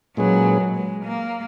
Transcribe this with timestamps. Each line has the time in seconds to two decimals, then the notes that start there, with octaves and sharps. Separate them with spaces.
0.17 A#2 F#3 G#3 C#4 G#4 B4
0.75 G#3
1.05 A#3